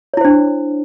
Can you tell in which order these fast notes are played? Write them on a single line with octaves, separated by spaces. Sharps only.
C#5 E4 C5 D4